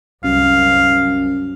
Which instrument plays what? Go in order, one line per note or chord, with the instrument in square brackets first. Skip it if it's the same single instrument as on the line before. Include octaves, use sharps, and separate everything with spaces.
[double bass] C2 [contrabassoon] F#2 [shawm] F5